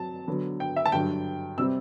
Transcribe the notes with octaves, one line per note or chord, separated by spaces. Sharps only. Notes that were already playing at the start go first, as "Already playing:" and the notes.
Already playing: F#3 C4 A5
D3 F#3 B3
G5
E5
A5
G2 D3 F#3 G5
C3 G3 C4 E6